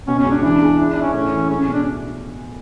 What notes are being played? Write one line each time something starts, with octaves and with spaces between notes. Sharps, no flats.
B2 C#4
C#4
C#2
D4
E3 D4
G#3
D4 E4
D4
E4
C#4
A2 C#4
E3
G#3 C#4
C#4
B2
D4